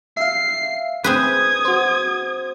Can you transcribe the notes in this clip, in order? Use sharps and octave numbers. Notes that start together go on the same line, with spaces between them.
E5 F5 C7
C4 G#4 B4 D#6 G#6
F#4 C5